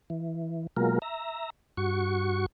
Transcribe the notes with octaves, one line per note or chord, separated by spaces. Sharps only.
E3
B2 F#3 G#3 A#3 F4 A#4
E5 A#5
G2 F#4 C#6